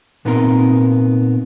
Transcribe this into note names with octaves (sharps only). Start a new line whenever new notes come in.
A#2 B3 C4 D#4 A#4